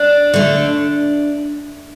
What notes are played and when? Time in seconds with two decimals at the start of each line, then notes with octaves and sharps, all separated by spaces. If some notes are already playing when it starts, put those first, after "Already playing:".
Already playing: D4
0.34 D3 A3